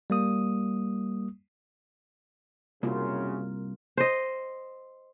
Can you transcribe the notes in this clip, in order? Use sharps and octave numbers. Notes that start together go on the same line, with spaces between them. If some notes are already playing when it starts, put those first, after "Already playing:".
G3 A#3 D#6
C2 F#2 C#3 A#3 F4
C5 D#5